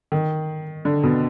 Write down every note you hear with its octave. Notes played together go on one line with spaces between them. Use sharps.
D#3
D3
B2